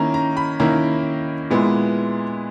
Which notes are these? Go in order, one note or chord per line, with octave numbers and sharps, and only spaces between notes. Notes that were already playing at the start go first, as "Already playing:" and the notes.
Already playing: D#3 A#3 C#4 E4 A#5
A#5
B5
D#3 A#3 C#4 E4 A#5
A#2 G#3 B3 E4